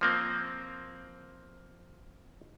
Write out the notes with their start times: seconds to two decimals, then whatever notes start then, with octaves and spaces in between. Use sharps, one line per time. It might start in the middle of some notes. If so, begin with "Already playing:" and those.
0.01 F3 A#3 C4